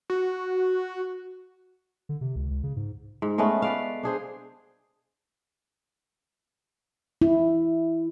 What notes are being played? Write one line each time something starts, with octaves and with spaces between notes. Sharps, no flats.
F#4
D3
C3
C#2
C#2
C#3
G#2
G#2
G#3 A3 B3 C#4
B4 D5 F5
D4 G#4 C5
E4